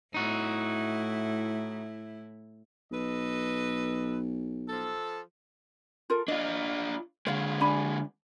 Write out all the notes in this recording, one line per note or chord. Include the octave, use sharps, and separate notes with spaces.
A2 D#4 E4 F#4
B1 A4 B4 D#5
F3 A4
F4 A4 A#4
D4 F4 D#5
D3 G#3 C#5 F5
D4 G#5 B5